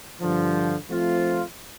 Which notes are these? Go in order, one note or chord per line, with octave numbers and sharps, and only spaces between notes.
G2 D3 F3
F3 A3 C4 F4